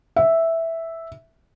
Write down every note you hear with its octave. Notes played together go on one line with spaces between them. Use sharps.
E5